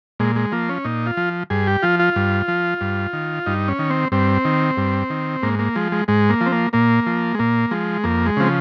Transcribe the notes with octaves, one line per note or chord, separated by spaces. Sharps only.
A#2 G#3
G#3
F3 A#3
C#4
A#2 D#4
F4
F3
G2 G#4
G4
F3 F4
F4
G2
F3
G2
D#3
G2 D#4
C#4
D#3
C4
G2 C4
D#3
G2
D#3
G#2 A#3
A#3
F3 G#3
G#3
G#2 G#3
A#3
F3
C4
A#3
A#2 A#3
F3
G#3
A#2 A#3
F3 G#3
F2 A#3
G#3
C#3 F3 C4